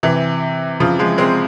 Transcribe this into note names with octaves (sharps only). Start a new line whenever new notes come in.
C3 E3
C#3 F3
F3 G#3
G#3 C4